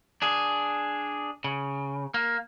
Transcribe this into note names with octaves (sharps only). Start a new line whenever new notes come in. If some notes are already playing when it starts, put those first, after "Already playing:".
D4 G#4
C#3
A#3